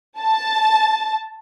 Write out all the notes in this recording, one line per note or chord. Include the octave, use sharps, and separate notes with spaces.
A5